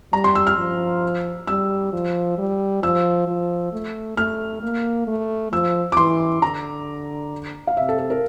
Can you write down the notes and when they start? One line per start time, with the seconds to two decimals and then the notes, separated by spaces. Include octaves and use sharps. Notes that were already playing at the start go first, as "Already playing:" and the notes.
0.13 G3 A#5
0.24 C6
0.35 E6
0.47 F6
0.58 F3
1.47 G3 E6
1.93 F3
2.38 G3
2.83 F3 E6
3.27 F3
3.73 A3
4.17 A3 F6
4.63 A#3
5.07 A3
5.52 F3 E6
5.92 D6
5.97 E3 C6
6.42 D3 A#5
7.67 F5
7.76 C3 E5
7.89 A4
7.99 A4
8.10 A#4